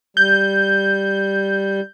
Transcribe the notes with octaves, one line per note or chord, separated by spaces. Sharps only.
G3 G6